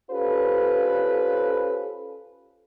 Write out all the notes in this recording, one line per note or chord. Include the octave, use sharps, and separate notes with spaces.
C#4 F4 G4 A4 B4 C5